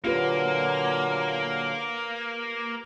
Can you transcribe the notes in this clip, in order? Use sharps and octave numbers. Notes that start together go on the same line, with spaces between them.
A#2 D3 F#3 A#3 F4 G4 B4